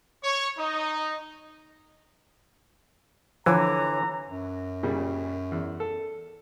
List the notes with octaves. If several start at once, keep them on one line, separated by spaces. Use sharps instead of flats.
C#5
D#4
D3 E3 F3 C#5 A#5
F#2
A#2 C#3 G3
E2
A4